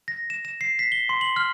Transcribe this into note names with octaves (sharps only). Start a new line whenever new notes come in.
A#6
E7
E7
C7
B6
G7
C6
F#7
F6